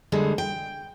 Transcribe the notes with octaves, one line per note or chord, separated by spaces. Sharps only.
D3 G3 G#3
G5